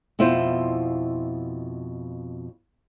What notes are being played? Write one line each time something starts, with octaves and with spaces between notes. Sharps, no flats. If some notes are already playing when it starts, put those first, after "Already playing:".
F2 B2 E4 F4 C5